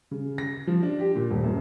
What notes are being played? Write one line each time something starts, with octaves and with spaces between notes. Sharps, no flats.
C#3
A#6
F3
D4
G4
A#2
D#1
F#2